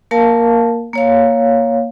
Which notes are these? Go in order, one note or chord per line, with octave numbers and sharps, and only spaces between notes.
A#3 A#4 F5 A5
A#3 C#5 F5